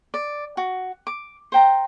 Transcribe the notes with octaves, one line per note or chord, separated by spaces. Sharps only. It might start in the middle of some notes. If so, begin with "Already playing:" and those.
D5
F#4
D6
C5 G5 A#5